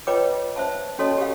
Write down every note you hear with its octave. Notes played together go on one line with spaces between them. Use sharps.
F4 B4 C#5 D#5 G5 D6
C5 E5 A5
C#4 F#4 A4 C#5 D#5 A5
G4 A4 F5